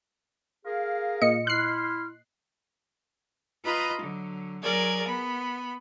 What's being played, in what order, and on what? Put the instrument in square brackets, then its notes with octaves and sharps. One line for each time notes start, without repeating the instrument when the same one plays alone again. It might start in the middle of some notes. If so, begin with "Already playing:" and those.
[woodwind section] G#4 A#4 F5
[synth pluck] A#2 D#5 C#7
[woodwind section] E4 C6 F6 [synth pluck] F#6 C7
[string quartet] F4 B4 D#5 A#5 B5
D3 F#3
F#3 G#4 A#4 D5 G#6
B3 B5